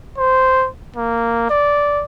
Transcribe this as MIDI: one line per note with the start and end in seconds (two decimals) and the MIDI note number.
0.18 0.68 72
0.96 1.48 58
1.50 2.04 74